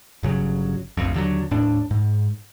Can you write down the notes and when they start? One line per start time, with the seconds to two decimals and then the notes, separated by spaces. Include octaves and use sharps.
0.23 G1 C#3 F#3
0.97 F1 A#1 F2
1.14 D#2 D3 E3 F#3
1.51 D#1 A2 D4
1.91 G#2